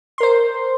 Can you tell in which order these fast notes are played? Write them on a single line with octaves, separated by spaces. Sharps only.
C6 A#4 C5